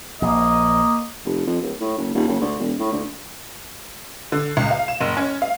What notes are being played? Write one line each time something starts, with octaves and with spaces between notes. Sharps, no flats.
A#1 A#3 D#5
F1
F2
D1
A2
F#1
D#1
F#1
D2
E1
A2
D2
D3
C#2
F5
E7
F#1
C#4
F5